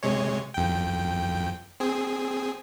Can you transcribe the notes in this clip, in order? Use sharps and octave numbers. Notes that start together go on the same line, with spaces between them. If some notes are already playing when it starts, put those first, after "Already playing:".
C3 G#3 C#5
F2 G5
C4 G#4